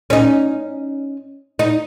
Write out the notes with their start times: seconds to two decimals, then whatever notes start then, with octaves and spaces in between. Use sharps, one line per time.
0.10 C#4 D#4
1.59 D#4